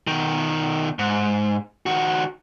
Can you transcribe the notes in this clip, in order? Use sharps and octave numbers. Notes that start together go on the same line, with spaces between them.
B2 D#3
G#2
D#3 F#4